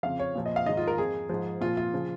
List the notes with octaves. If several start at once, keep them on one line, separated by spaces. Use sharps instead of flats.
F2 C#3 F3 F5
C#5
A#2 F3
D#5
F5
G#2 D#3 D#5
F4
A#4
F2 F3 G#4
G#2 F3
A#2 F3 F4
F4
C#3 F3